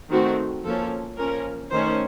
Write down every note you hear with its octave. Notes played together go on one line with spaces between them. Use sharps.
D#3 A3 C4 F#4
F3 A#3 C#4 A4
F3 A#3 C#4 A#4
D#3 A3 C#4 C5